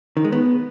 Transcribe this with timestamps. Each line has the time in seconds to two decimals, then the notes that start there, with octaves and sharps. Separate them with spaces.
0.17 D#3
0.24 G#3
0.32 B3